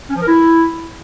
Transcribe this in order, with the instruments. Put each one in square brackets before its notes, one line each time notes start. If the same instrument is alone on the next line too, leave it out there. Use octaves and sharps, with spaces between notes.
[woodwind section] C#4
F3
A#4
E4